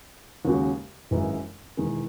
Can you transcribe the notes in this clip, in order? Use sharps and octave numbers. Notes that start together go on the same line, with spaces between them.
D#2 C#3 G#3 C#4 F#4
G#1 F#2 E3 G#3 D#4
E1 E2 D#3 G#3